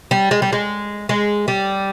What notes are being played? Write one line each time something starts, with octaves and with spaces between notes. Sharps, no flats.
G3
G#3
G3
G#3
G#3
G3